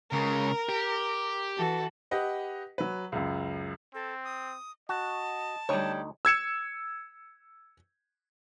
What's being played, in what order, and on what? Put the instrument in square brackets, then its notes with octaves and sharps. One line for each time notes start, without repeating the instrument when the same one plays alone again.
[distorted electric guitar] C#2 C#3 [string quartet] A#4
[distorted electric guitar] G4
[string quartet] E3 F#4 A4
[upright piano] G4 B4 D#5 F#5
F#3 B4
C#2 F#2
[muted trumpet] C4 [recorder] A4
[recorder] D#6
[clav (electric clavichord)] F#4 [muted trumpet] D#5 [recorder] A5
[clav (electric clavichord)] D2 D#4 [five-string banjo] G3 C#5 [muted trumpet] G5
[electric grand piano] E6 G#6 C#7 E7